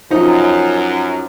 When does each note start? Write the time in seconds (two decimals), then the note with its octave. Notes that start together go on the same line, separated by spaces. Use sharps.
0.10 F#2 F3 D#4